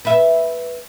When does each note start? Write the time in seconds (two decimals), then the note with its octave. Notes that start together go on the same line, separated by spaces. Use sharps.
0.05 B4 E5